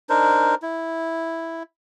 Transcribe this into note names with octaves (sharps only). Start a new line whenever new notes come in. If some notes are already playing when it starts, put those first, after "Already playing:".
D4 D#4 A#4 C5
E4